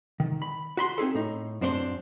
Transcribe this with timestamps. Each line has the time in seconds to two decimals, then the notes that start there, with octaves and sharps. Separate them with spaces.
0.20 D#3
0.42 B5
0.77 F#4 B5 C6
0.98 C4 D#4 G#4 A4
1.15 A2 D#4
1.61 F#2 C4 D4 E4 C5